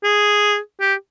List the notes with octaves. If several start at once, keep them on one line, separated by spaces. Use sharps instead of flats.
G#4
G4